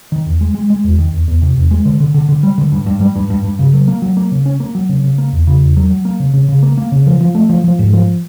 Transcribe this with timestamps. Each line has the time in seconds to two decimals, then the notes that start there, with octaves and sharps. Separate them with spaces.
0.12 D#3
0.26 E2
0.41 G#3
0.55 G#3
0.70 G#3
0.84 E2
0.99 D#3
1.13 E2
1.28 E2
1.42 C3
1.56 E2
1.71 G#3
1.85 D3
2.00 D3
2.14 D3
2.29 D3
2.43 G3
2.58 D3
2.72 G2
2.86 G2
3.01 G3
3.16 G2
3.30 G2
3.44 G2
3.59 C#3
3.74 F#3
3.88 A#3
4.02 F#3
4.17 A#3
4.31 C#3
4.46 C#4
4.60 A#3
4.75 F#3
4.89 C#3
5.04 C#3
5.18 A#3
5.32 E2
5.47 C#3
5.62 E2
5.77 F#3
5.90 F#3
6.05 A#3
6.20 C#3
6.34 C#3
6.49 C#3
6.63 A#3
6.77 A#3
6.92 C#3
7.06 F3
7.21 F3
7.35 A3
7.49 F3
7.64 F3
7.79 G#2
7.93 F3